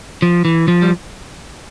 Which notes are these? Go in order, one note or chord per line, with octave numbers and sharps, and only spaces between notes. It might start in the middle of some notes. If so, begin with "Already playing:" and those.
F3
E3
F3
G3